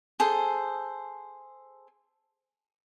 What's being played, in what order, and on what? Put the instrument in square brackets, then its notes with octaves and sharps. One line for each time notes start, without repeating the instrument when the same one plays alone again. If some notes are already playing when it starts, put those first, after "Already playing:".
[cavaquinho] G#4 A4 C5